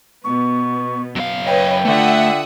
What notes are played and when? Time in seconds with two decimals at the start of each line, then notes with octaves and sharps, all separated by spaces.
0.24 B2 B3 C#6
1.16 F#2 F5
1.47 B4 C#5 D#5 G5
1.85 D3 A3 F4 E5 F#5 D#6